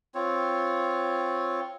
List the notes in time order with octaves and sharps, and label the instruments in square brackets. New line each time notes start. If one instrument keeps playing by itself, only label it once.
[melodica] C4 F4 C#5